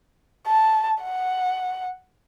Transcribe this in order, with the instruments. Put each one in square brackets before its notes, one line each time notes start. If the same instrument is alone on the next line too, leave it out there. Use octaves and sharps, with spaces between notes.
[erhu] A5
F#5